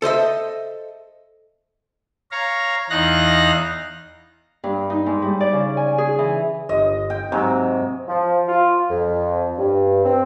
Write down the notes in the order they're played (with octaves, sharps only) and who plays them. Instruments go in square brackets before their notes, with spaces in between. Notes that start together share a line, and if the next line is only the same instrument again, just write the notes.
[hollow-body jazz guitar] A4 C5 D#5 E5
[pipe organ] C#5 F5 A#5
E2 D#4 F5 F#6 A#6
[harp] G2
D#4
G#2
G3
D5
C#3
G#5
G#4
E3
[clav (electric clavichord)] G1 [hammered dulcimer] D#5
[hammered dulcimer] G5
[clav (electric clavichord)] G#2 F#3 [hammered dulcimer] C3
[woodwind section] F3
F4
F2
G2
C4